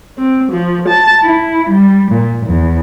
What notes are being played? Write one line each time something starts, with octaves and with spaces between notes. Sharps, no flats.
C4
F3
A5
E4
G3
A#2
E2